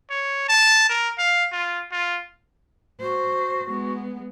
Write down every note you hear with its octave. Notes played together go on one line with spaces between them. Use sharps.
C#5
A5
A#4
F5
F4
F4
F#4 C5
G#3 B3